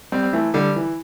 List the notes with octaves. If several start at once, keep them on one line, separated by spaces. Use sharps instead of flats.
G3 C4
C4
E3 A3
D3 G3
E3